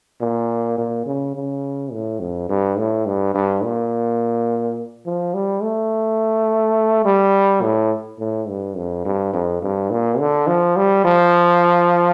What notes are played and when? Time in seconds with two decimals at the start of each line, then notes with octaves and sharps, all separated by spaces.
0.21 A#2
0.78 A#2
1.06 C#3
1.35 C#3
1.92 A2
2.20 F2
2.49 G2
2.78 A2
3.06 G2
3.34 G2
3.63 A#2
5.06 F3
5.34 G3
5.63 A3
7.05 G3
7.62 A2
8.19 A2
8.48 G2
8.76 F2
9.05 G2
9.34 F2
9.62 G2
9.91 A#2
10.19 D3
10.47 F3
10.76 G3
11.05 F3